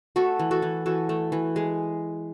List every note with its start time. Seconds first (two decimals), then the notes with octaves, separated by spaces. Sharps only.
0.16 A3 F#4 A4
0.39 E3
0.51 F#4 A4
0.62 E3
0.86 E3 F#4 A4
1.09 A3
1.32 E3
1.56 G#3